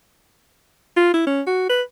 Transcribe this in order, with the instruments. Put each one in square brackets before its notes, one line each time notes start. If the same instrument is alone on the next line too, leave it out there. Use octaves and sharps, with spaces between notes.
[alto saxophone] F4
E4
C#4
F#4
B4